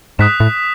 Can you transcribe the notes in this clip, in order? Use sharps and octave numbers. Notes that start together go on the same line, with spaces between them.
G#2 D#6 F#6 B6 E7
A2